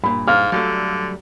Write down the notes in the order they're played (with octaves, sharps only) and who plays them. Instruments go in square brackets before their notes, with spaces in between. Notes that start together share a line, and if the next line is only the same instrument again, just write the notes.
[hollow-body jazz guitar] G2 A#2 [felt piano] B5
[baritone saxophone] G#2 [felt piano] F5 F6
[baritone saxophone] D3 [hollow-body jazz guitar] F#3 G3 A3